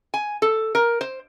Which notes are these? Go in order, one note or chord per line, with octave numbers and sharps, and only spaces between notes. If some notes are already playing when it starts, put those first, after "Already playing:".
G#5
A4
A#4
C5